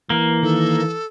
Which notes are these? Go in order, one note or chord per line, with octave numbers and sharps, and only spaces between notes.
E3 A#3
D#3 A4